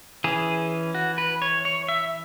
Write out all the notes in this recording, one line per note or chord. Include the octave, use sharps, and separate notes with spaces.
E3 C#4 G#4
F#4
B4
C#5
C#5
E5